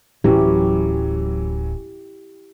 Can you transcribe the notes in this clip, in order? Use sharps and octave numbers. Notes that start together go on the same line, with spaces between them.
D1 E3 F#3 C#4 E4 G4